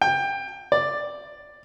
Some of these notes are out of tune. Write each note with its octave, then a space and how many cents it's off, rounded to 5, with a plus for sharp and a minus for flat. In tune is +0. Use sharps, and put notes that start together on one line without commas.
G5 +20
D5 +5